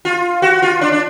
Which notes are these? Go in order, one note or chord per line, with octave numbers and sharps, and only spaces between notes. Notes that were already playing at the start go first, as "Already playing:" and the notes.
F4
F#4
F4
D4
D4